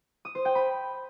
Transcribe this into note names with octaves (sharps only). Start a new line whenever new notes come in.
D#6
C5
G5
B5